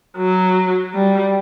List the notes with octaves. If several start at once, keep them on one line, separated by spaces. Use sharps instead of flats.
F#3
G3